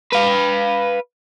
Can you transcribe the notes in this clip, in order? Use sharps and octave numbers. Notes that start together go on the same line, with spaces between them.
B4 F5